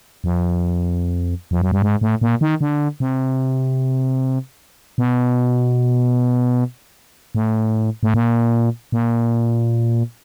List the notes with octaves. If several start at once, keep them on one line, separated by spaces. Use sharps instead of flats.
F2
F2
F#2
G2
G#2
A2
A#2
D#3
D3
C3
B2
A2
A2
A#2
A#2